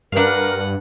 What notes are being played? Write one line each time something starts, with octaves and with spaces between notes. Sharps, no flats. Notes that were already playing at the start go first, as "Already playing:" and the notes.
G2 D4 A#4 B4 F5 F#5